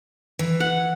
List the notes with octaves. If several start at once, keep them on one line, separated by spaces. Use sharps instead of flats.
E3
F#5